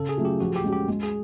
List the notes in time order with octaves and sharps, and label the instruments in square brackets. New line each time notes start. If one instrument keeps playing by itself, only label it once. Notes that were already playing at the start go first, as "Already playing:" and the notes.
Already playing: [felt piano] C#3 [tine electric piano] A4
[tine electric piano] G#4
[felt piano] F#3 A3 C#4 F4
[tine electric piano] G4
[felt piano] F3 [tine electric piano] F#4
[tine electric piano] G4
[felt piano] G#3 C#4 F#4
[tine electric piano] G4
[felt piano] G#3
[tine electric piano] G#4